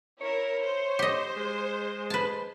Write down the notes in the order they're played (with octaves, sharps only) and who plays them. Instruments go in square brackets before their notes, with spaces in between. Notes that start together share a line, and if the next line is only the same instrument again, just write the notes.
[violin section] E4 A#4 [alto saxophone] C#5
[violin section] C5
[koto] G4 D#5
[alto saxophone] G#3
[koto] B4 A5